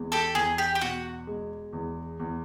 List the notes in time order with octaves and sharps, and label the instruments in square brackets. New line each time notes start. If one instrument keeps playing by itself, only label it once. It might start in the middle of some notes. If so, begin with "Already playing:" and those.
Already playing: [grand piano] E2 G#3
[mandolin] G4 A4
[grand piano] E2 [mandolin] G#4
[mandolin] G4
G4
[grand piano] B2 [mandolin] F#4
[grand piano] G#3
E2
E2